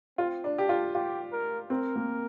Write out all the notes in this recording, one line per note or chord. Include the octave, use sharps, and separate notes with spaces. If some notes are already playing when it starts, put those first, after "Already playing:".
C4 F4
D4
D4 G4
F4
F4 G4
A#4
C4 A#4
A#3